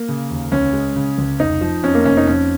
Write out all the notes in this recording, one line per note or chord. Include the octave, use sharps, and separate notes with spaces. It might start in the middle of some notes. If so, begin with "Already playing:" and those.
Already playing: A#3
C#3
D#2
C#2 C#4
G#3
C#3
C#2
F1 D#4
F3
F2 C#4
A#3
F1 C#4
D#4
F2 C#4